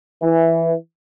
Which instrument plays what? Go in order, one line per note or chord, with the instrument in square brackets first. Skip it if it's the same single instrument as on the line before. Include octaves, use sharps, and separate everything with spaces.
[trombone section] E3